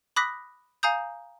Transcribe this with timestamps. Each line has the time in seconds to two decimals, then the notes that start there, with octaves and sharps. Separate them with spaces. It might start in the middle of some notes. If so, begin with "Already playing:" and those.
0.16 B5 D6 D#6 F#6 A#6 B6
0.83 F5 G#5 A#5 D#6 G6